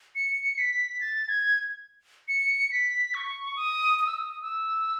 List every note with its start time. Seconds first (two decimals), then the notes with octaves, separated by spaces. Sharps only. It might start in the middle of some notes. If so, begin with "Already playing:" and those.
0.15 C#7
0.58 B6
1.01 A6
1.29 G#6
2.28 C#7
2.71 B6
3.14 C#6
3.56 D#6
3.99 D#6
4.07 E6
4.14 D#6
4.42 E6